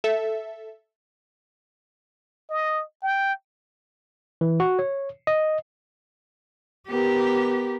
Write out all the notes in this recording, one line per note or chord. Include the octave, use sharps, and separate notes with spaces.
A4 E5
D#5
G5
E3
F#4
C#5
D#5
B3 G4 A#4